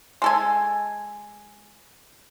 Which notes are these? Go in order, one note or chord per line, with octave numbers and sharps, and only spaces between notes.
G#3 A4 G#5